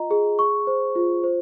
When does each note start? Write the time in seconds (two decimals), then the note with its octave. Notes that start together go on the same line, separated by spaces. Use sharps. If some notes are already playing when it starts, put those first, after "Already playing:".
Already playing: F4 D#5 A#5
0.11 G#4
0.39 C#6
0.67 C5
0.96 F4
1.24 C5